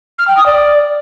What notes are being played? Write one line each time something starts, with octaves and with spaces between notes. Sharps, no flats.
F6
G5
D#6
D5